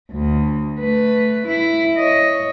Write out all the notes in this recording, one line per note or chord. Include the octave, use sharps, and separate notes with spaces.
D2
A3 B4
E4
C#5 D#5